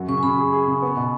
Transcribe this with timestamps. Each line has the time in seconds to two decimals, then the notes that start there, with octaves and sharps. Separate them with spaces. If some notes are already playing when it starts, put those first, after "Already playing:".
Already playing: F#2 F#4
0.09 C#3 C#6
0.18 G#5
0.23 C#3 B5
0.37 G#4 C#6
0.53 G#4
0.68 C#3
0.82 B3
0.97 B2